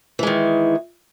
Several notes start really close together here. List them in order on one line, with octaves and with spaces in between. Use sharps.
E3 G#3 D#3